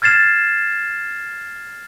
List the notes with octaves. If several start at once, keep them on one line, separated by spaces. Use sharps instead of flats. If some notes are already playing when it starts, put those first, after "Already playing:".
F6 G#6 A6 C7 E7